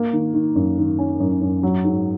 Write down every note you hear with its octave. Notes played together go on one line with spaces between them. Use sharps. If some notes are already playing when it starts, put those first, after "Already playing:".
Already playing: A#3
D#3
D#3
F#2
D#3
C#4
F#2
F#2
F#3
G#2